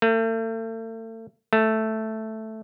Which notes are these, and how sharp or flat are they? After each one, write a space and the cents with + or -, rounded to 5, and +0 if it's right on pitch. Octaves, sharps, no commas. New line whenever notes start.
A3 +40
A3 +0